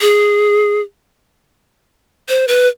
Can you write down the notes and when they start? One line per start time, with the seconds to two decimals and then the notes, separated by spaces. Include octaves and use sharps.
0.01 G#4
2.29 C5
2.48 B4